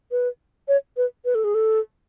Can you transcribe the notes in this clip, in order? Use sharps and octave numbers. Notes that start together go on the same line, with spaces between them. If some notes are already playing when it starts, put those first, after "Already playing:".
B4
C#5
B4
B4
A4
G#4
A4